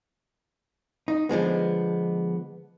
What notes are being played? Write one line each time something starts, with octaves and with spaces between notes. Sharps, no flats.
D#4
D3 F3 G#3 B3